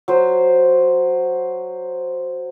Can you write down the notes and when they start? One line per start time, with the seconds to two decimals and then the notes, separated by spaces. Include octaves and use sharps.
0.08 F#3 C5